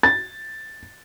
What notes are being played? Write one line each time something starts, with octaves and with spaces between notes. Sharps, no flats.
A6